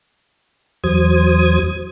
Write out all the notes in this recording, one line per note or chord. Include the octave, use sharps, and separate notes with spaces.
E2 F#3 C5 D#6 G#6